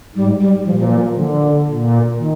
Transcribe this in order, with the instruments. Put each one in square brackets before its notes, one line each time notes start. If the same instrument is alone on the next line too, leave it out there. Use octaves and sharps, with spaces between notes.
[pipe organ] G#2 [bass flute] G3
[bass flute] G3
[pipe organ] A#2 [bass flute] F3
[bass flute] F3
F3
F3
D3
[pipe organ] A#2
[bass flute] D#3